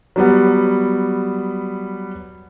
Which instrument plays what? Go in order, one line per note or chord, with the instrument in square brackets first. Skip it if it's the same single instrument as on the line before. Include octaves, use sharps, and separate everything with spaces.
[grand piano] F#3 G3 B3